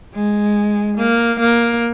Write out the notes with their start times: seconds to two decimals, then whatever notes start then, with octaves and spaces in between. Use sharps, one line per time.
0.15 G#3
0.98 A#3
1.39 A#3